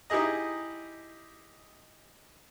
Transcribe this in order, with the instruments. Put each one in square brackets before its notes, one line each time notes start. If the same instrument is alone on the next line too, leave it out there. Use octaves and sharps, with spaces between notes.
[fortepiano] D#4 E4 G4 G#4 D#5